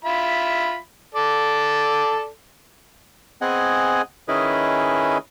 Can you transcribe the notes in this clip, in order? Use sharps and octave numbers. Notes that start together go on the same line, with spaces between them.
F4 E5 B5
A4 D5
B3 C4 G#4 D#5 F#5 G#5
D#3 C#4 E4 G#4 B4 D#5